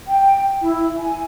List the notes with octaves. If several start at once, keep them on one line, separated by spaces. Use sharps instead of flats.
G5
E4
G#5